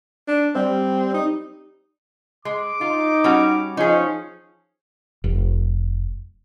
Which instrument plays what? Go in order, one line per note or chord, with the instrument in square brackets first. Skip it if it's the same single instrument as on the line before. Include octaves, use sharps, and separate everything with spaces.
[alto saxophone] D4
[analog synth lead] G3 [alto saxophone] C4
[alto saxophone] D#4
[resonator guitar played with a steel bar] G#3 [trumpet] D6
[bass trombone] D#4 [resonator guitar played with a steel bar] F4
[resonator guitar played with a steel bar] G3 C#4 F#4
[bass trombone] F3 [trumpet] C#4 [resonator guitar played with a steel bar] D#4 G#4
[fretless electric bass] F1